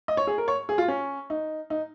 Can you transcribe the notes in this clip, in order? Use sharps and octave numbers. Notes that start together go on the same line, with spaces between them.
D#5
C#5
G#4
A#4
C#5
G#4
F4
C#4
D#4
D#4